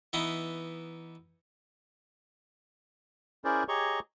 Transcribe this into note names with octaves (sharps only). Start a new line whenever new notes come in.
E3 B3 D#4 E4
C#4 E4 G#4 A#4 C5 D5
G4 G#4 C#5 D#5 A#5 C#6